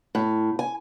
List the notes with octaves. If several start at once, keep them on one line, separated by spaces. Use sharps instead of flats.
A2
G#5